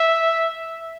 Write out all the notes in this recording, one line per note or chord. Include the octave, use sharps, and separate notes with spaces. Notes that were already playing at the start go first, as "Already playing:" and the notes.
Already playing: E5